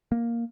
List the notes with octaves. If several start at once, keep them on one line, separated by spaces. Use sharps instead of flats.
A#3